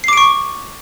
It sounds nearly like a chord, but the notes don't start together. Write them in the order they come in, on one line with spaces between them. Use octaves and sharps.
C7 D6 D7 C#6